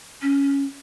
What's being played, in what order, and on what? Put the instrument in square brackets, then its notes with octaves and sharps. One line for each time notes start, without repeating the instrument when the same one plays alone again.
[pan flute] C#4